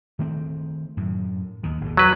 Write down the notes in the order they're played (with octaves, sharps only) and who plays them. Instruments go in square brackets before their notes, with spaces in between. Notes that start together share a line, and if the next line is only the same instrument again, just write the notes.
[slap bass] D#3 A3 C4
F#2 A2
D#2 D#3
G#1 D#2 B2
[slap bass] F2 [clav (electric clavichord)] F#3 B4